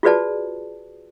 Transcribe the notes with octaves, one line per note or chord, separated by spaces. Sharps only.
F4 F#4 G#4 B4 D5 A5